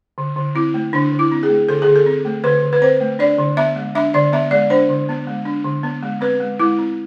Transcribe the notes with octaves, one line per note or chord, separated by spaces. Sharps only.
D3
D3
C4 E4
A3
D3 D4
D3
E4
C4
G#4
A3
D3 A4
D3 G#4
A4
C4
A3
D3 B4
D3
B4
C4 C5
A3
D4 D5
D3
B3 E5
G#3
D4 E5
D3 D5
B3 E5
G#3 D5
D4 C5
D3
B3
G#3
D4
D3
B3
G#3
C4 B4
G#3
G#3 E4
C4